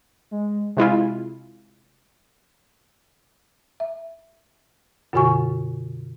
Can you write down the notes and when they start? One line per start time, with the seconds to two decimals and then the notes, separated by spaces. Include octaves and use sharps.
0.31 G#3
0.77 C3 G#3 E4 F4
3.80 E5
5.13 F#2 B2 D3 F#4 G#5 C#6